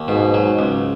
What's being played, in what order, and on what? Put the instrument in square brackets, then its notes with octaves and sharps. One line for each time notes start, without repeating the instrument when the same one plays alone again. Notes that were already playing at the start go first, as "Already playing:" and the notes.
Already playing: [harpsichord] D#2
[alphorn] G#2 [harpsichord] B2
[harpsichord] F#3
C#2